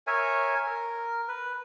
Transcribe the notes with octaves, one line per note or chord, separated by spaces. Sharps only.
A#4 C#5 E5 G#5
A#4
B4